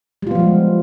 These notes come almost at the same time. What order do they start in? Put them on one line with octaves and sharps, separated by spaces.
G3 F4 B3 F3 G#3